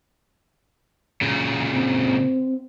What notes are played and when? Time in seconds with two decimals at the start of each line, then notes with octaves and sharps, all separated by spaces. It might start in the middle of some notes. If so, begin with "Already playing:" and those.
1.21 A#2 C#3
1.75 C4